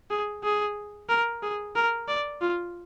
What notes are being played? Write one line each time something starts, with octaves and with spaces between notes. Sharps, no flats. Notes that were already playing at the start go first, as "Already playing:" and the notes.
G#4
G#4
A#4
G#4
A#4
D5
F4